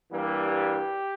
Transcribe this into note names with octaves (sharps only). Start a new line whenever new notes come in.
G2 E3 G3 A#3 G4